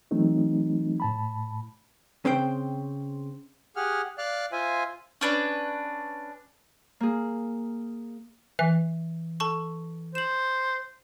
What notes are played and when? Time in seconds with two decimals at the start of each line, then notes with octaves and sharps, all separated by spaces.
0.11 E3 F#3 A3 C4 D#4
1.00 A2 A5 B5
2.25 C#3 C4 C5 G5
3.76 G4 G#4 F#5 F6
4.18 D5 F5 F6 F#6
4.52 F4 C5 E5 G#5
5.21 C#4 D4 B4
7.00 A#3 G#4
8.59 E3 E5
9.40 A4 A5 C#6
10.15 C5 E7 F#7